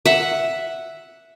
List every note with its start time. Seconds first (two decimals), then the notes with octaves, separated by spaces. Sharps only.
0.06 E5 F#5